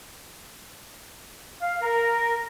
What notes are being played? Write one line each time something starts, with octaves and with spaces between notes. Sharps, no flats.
F5
A#4